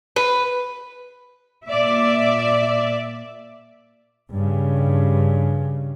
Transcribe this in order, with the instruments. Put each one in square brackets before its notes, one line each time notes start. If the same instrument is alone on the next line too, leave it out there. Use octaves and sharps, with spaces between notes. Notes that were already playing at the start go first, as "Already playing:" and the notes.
[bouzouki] B4
[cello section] A#2 D5 E5
[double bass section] G2 C#3